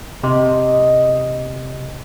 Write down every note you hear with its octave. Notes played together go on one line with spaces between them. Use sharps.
C3 D#5